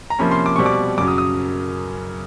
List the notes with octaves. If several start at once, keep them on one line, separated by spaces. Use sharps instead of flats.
A#5
C3 F3 A#3 C#4 B5
C6
D6
B2 G3 C4 C#6
D6
F#2 C#3 F#3 D6
D#6
D#6